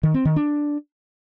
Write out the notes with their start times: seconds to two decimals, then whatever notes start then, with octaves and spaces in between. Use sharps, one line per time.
0.03 D#3
0.14 C4
0.25 D#3
0.36 D4